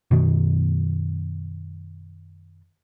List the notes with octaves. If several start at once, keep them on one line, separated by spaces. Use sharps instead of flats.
F#2 B2 D#3